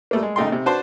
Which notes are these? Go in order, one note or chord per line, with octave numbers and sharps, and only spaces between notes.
G3 A3 A#3
G#3
A#1 C#3 A3 D#4 G5 C6
C3
D4 F#4 B4 C5 A5 C6